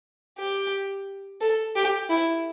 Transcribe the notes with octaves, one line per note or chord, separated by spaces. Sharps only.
G4
A4
G4
E4